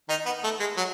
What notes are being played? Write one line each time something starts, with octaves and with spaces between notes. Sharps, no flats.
D#3 D#4
B3
A3
G#3
F#3